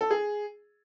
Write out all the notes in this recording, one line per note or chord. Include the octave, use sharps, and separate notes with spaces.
A4
G#4